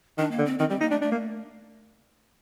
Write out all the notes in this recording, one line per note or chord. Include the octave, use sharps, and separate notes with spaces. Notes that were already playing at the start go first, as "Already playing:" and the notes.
D#3 D4
A#3
D3
C4
D#3 C4
G3 C4
A#3 D#4
A3 D4
A3 D4
A#3